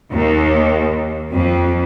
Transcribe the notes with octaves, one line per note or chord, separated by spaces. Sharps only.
D#2
F2